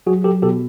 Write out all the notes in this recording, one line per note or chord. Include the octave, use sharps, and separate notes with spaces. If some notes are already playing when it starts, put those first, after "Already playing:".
F#3 F#4 G#4
F#3 G4 A4
B2 G4 A4